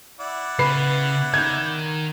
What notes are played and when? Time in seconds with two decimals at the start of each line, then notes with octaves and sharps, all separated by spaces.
0.20 E4 D5 F#5
0.59 C#3 B4 C7
1.34 D#3 G6 G#6